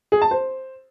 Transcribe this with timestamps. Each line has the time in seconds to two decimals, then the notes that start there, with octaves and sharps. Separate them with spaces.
0.12 G#4
0.22 A5
0.31 C5